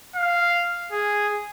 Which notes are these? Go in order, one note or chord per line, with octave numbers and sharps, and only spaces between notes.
F5
G#4